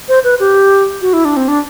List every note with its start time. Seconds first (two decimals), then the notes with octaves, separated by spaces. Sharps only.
0.09 C5
0.24 B4
0.40 G4
1.02 F#4
1.13 E4
1.25 D4
1.37 C4
1.48 D4